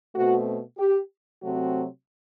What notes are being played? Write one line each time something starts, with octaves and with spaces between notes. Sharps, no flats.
B2 A3 C4 F#4
G4
C3 F#3 A3 C4 F#4